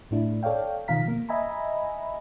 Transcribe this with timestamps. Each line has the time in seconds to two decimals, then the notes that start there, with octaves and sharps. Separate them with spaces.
0.11 A2 A3 D4 E4
0.43 A4 C#5 D5 F5 G5
0.88 B2 D#3 F3 F5 A#5 B6
1.08 A#3
1.29 D#5 E5 G#5 A#5 B5